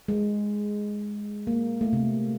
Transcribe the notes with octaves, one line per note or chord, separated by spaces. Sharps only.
G#3
A#3
A3
C3